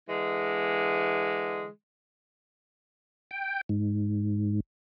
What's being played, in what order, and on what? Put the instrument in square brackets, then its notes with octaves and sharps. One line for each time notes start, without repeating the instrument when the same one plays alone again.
[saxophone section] D3 E3 G#3
[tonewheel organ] G5
G#2